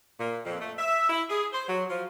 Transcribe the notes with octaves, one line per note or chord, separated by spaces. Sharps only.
A#2
F2
A3
E5
E4
G#4
C5
F#3
F3